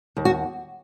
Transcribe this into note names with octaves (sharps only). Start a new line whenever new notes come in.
D#2
F#4